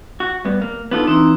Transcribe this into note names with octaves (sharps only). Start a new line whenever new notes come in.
F#4
G2 B3
A#3
B3 D4 D#4 F4 A4 D#6
E3 C4 D#4 A#5